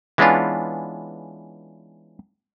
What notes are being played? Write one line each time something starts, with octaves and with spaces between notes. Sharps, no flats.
E3 G#3 B3 C#4 D4 F4